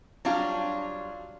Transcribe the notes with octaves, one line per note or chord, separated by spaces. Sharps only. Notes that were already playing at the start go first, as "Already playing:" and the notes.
F#3 G3 D4 F4